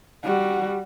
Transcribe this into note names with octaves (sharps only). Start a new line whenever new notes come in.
G3 F#4